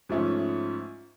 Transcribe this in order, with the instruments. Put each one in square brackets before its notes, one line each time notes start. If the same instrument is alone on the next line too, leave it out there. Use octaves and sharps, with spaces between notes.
[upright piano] G#2 F3 A3 C#4